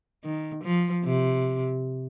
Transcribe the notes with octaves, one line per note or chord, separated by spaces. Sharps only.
D#3
F3
C3